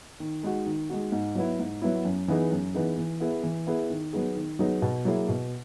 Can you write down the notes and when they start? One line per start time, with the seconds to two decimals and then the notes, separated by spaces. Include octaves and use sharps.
0.20 D#3
0.43 G#3 D#4 F#4
0.66 D#3
0.90 G#3 D#4 F#4
1.12 G#2
1.35 F#3 B3 E4
1.59 G#2
1.82 F#3 B3 E4
2.05 F#2
2.28 E3 B3 D#4 G#4
2.51 F#2
2.74 E3 B3 D#4 G#4
2.97 E3
3.20 B3 E4 G#4
3.43 E3
3.67 B3 E4 G#4
3.90 D#3
4.13 F#3 B3 D#4 G#4
4.36 D#3
4.59 F#3 B3 D#4 G#4
4.82 B2
5.05 F#3 A#3 E4 G#4
5.29 B2